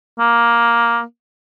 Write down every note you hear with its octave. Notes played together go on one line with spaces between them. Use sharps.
A#3